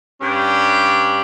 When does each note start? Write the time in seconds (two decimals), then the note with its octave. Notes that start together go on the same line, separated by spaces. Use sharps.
0.20 G2 C#4 D4 G4